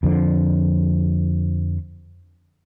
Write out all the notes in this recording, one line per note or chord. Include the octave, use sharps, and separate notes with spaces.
F2 D3 F3